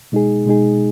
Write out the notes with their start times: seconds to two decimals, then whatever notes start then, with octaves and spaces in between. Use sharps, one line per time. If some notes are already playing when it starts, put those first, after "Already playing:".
0.12 B2 G#3 D#4 G#4
0.46 B2 G#3 D#4 G#4